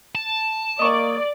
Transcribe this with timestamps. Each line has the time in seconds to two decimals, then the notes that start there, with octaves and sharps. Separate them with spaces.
0.15 A5
0.79 A#3 D5 D#5 C#6